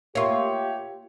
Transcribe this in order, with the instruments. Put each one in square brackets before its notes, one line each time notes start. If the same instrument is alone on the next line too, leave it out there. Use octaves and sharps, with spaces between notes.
[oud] A#3 F4 [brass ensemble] G4 [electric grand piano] C#5 E5 C#6